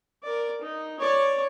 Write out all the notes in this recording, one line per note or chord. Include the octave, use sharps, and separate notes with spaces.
A#4 D5
D#4
C#5 D5